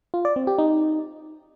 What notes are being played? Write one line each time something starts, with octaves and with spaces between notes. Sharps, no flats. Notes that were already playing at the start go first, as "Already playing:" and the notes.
F4
D5
C4
G4
D#4